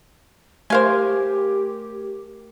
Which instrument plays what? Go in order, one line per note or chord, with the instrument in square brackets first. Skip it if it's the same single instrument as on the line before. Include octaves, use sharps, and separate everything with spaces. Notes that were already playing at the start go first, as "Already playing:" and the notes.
[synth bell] A3 A#4 [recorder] G4 [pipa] C5 F5 G#5